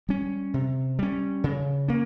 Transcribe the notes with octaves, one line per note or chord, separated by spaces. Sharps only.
G3 C#4
C3
G3 C#4
C#3
A#3 C#4